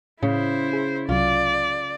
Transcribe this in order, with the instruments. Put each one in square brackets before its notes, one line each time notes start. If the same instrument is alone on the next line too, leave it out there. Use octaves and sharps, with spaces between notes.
[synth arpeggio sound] A2 [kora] C#3 [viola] E4 C5
[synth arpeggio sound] G#4
[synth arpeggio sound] C2 C3 F#3 [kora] F4 [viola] D5